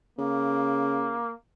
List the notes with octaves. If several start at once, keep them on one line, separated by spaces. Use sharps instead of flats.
C#3 A#3